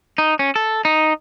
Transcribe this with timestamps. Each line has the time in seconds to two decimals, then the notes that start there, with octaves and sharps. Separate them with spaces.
0.18 D#4
0.39 C#4
0.56 A4
0.85 D#4